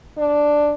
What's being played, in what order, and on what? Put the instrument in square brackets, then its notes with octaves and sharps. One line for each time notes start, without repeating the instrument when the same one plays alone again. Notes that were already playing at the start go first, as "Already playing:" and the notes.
[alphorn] D4